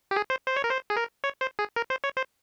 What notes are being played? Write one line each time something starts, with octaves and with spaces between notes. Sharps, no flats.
G4
G#4
C5
C5
C#5
A#4
C5
G#4
A#4
C#5
C5
G#4
A#4
C5
C#5
C5